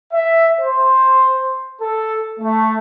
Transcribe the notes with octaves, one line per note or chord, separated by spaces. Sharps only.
E5
C5
A4
A3